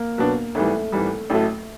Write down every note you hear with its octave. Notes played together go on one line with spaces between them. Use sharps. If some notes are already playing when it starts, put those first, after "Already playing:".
Already playing: A#3
B2 F#3 B3 D4
G#1 G#2 E3 G3 A3
G#1 G#2 E3 G3
A1 A2 F#3 A3